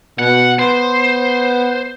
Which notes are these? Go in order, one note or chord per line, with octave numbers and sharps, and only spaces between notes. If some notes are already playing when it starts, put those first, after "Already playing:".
B2 F#5
B3 C5